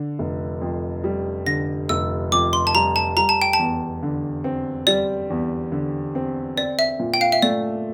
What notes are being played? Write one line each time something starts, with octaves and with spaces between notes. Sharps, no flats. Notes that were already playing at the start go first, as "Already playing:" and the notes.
Already playing: D3
F1
F2
G3
D3 A#6
F1 E6
F2 D6
C6
A5
G3 A#5
A5
G3 A#5
A5
G5
A5
E2
D3
C4
G3 D5
E2
D3
C4
C4 D5
E5
A#2
G5
F5
E5
A3 D5